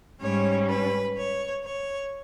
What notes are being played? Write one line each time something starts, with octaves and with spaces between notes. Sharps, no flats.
G#2 G3 C#4 C#5
B4
C#5
C#5